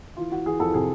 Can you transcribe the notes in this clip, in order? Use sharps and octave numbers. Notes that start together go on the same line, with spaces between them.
E3 F4
E3 F#4
E3 G#4
F2 A4
C3 G#4